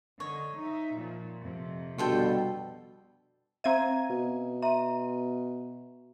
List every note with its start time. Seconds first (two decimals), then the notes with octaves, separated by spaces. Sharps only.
0.20 D3 C#5 D#5
0.58 D#4 E5
0.97 A#2 F3
1.41 F2 C3
1.98 B2 D3 G3 F4 A4 G5
3.64 C4 E5 F5 A#5 G#6 D#7
4.10 B2
4.62 E5 A#5 C6 D#7